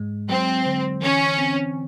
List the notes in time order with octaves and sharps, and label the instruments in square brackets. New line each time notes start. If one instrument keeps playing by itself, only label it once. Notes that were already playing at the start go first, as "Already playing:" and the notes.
Already playing: [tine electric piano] G#2 G#3
[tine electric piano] F#3 [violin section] C4
[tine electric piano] D3
[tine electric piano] E3 [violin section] C#4
[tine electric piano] C4